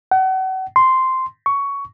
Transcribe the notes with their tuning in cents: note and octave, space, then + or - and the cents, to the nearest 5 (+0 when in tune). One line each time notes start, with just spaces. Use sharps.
F#5 +35
C6 -5
C#6 +15